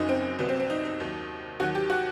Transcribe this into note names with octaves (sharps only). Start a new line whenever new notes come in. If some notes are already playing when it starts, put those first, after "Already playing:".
Already playing: F#1 F#2 F#3 D#4
C4
C2 C3 F#3 B3
C4
C4
D#4
D#4
D#2 D#3 F#3
D#2 D#3 F#3 F#4
G4
F#4